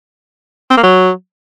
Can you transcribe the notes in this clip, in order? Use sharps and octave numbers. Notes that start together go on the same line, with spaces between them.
C4
A#3
F#3